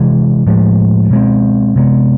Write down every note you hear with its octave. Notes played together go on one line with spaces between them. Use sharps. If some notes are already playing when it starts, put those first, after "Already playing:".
Already playing: C3 E3 G#3
A2 F3 G#3
B2 G#3 C4
C3 G#3 B3